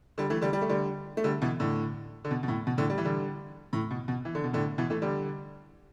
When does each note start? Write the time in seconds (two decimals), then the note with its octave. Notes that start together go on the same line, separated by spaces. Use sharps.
0.18 D3 G3
0.30 E3 A3
0.41 D3 G3
0.53 G3
0.62 A3
0.69 D3 G3
1.17 A3
1.24 D3 G3
1.42 B2 E3
1.60 A2 D3
2.25 D3
2.31 B2
2.43 B2
2.48 A2
2.67 B2
2.78 A2 D3
2.90 G3
2.98 E3
3.05 D3 G3
3.73 A2
3.91 B2
4.08 B2
4.25 E3
4.35 D3
4.44 B2
4.53 A2 D3
4.78 B2 E3
4.90 E3 A3
5.02 D3 G3